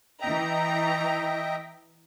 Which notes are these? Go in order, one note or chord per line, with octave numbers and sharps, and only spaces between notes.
E3 D#5 E5 G5 A#5